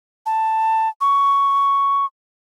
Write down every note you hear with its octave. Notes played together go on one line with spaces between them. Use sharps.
A5
C#6